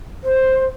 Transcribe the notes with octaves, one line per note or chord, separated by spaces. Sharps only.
C5